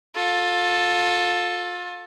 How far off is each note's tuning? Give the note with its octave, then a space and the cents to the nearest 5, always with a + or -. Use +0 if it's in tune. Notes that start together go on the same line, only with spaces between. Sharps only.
F4 +30 A4 +0